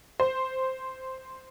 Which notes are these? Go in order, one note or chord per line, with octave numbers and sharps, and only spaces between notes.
C5